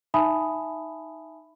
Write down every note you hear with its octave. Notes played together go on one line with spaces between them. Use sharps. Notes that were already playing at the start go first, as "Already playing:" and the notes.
D#4 E5 G#5 A5 B5 D#6